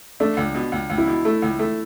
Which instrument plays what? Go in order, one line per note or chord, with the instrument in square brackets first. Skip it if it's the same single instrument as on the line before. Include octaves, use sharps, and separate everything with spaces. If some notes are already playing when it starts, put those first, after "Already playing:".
[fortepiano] A3 [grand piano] D4
[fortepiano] C#2
B2
C#2
C#2
[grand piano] E4
[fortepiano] B2
A3
C#2
A3